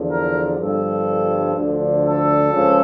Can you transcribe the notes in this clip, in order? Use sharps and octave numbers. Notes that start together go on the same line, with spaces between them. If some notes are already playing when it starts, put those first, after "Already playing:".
Already playing: E2 D3 F3
A#4
G1 G2 F3 A4
D2 D3 F3
A4
C#2 C#3 F3